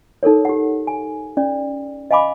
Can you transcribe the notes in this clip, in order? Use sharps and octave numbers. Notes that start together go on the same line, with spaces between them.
D#4 A4 A#4 C#5
G4 F#5
G#5
C#4 D5
D#5 F5 G#5 B5 D6